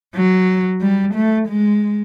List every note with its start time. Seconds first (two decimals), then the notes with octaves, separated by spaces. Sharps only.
0.15 F#3
0.81 G3
1.14 A3
1.48 G#3